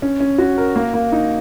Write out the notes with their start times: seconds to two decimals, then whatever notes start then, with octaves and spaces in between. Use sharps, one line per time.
0.02 C#4
0.20 C#4
0.38 F#4
0.57 A#4
0.76 A#3
0.94 A#3
1.12 D#4